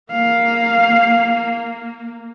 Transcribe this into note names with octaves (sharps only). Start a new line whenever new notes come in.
A#3 F5